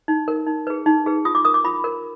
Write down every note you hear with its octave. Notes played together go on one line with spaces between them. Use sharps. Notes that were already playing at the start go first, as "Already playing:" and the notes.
D#4
A#4
D#4
G#4 B4
D#4
G#4 B4
F4 D#6
D6
A#4 D#6
D6
F4 B5
A#4